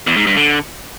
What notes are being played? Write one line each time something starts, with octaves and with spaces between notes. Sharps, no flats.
E2
G#2
G2
D3